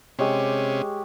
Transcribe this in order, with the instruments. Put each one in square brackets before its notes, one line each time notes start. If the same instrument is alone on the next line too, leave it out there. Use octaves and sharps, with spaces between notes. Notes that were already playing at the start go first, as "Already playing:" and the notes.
[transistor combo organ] C3 C#4 [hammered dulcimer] G#3 G4 C#5